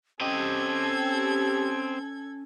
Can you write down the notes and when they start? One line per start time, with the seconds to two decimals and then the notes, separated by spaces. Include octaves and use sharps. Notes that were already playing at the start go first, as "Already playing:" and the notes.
0.21 C4 C#4 G4 A4 D#5 G#6